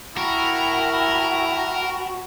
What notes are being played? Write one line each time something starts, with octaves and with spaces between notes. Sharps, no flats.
E4 F#4 A#4 G5 A5 B5